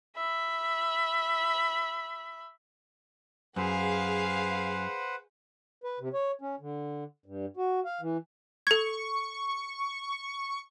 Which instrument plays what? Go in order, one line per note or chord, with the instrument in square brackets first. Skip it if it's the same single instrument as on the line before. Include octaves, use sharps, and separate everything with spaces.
[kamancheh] E5 B5
[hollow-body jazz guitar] F#2 [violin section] G#4 F5 [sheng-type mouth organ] B4 C5 F#5
[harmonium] B4
C3
C#5
C#4
D3
G2
F#4
F5
E3
[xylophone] A4 G#6 [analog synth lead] C#6